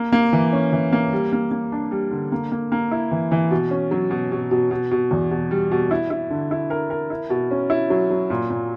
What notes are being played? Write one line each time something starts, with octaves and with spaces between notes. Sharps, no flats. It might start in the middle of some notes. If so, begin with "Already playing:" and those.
Already playing: A#3
A#3
E3
C#4
E3
A#3
G3
A#3
A#3
D4
G3
D3
A#3
A#3
A#3
E4
E3
E3
B2
C#4
F#3
B2
B2
B2
B2
B2
E2
B2
G3
B2
E4
E4
D3
E4
A#4
A#4
E4
B2
C#4
E4
F#3
F#3
A#2
A#2